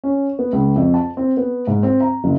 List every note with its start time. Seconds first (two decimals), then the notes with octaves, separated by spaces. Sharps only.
0.04 C#4
0.39 B3
0.53 C#2
0.76 F2
0.94 A5
1.17 C4
1.37 B3
1.67 G#2
1.83 C4
2.01 A#5
2.24 F#1